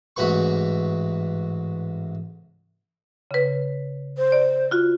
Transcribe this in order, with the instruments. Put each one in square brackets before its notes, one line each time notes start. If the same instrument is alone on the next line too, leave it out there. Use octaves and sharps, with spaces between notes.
[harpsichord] A1 G#2 F#4 B4 C#6
[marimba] C#3 B4
[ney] C5
[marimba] D5
F4 F#4